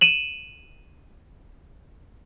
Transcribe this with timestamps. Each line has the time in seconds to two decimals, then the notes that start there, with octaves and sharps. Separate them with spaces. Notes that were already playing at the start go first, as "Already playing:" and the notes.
0.01 D#7 E7 F#7